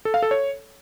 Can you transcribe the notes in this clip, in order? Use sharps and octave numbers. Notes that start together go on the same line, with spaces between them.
A4
F5
A4
C#5